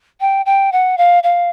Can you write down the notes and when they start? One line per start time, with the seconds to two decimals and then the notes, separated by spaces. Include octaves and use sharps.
0.21 G5
0.46 G5
0.72 F#5
0.98 F5
1.23 F5